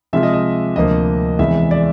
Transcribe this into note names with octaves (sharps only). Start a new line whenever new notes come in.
C3 F3 G#3 C4 F4 E5
D#5
D#5
D2 C3 F3 A#3 D#5
E2 C3 E3 G#3 E5
D5